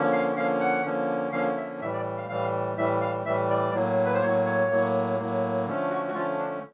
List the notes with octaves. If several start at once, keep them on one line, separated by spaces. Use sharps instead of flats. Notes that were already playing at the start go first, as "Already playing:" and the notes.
Already playing: D3 F3 A#3 C#4
F5
D3 F3 A#3 C#4 F5
F#5
D3 F3 A#3 C#4
D3 F3 A#3 C#4 F5
E5
A2 E3 G3 E5
D5
F5
A2 E3 G3 F5
A2 E3 G3 E5
F5
A2 E3 G3 E5
D5
A2 F#3 A#3
B4
C5
A2 F#3 A#3 C#5
C#5
A2 F#3 A#3
A2 F#3 A#3
D3 F3 A3 C#4
F#4
F#4
D3 F3 A3 C#4 F4
D4